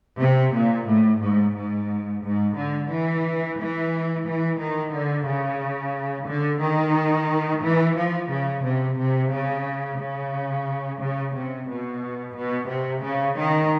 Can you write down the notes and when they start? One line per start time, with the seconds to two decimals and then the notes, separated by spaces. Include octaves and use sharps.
0.20 C3
0.54 A#2
0.88 A2
1.21 G#2
1.55 G#2
2.23 G#2
2.57 D3
2.91 E3
3.58 E3
4.25 E3
4.59 D#3
4.92 D3
5.27 C#3
6.27 D3
6.62 D#3
7.62 E3
7.97 F3
8.30 C#3
8.64 C3
8.98 C3
9.31 C#3
9.99 C#3
11.00 C#3
11.35 C3
11.69 B2
12.36 B2
12.69 C3
13.03 C#3
13.37 D#3